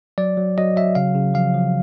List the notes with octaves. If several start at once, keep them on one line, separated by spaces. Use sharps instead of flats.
F#3 D5
F#3
F#3 D#5
F#3 E5
C#3 F5
C#3
F3 F5
F3